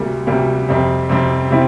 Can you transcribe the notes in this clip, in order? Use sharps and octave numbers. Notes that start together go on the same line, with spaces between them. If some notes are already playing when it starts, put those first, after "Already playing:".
Already playing: D2 C3 G3 A#3
D2 C3 G3 A#3
F2 C3 G3 C4
F2 C3 G3 C4
C3 G3 C4 E4